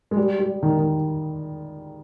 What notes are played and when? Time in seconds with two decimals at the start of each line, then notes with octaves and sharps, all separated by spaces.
0.11 G#3
0.17 G3
0.39 G3
0.63 D#3
0.77 D#3